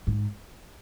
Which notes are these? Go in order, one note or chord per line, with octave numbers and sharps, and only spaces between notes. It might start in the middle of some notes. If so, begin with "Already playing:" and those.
G#2